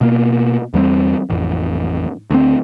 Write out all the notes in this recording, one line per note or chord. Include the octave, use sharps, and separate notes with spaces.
B2 A#3
E2 G3 A#3 C4
A1 F2
D2 C4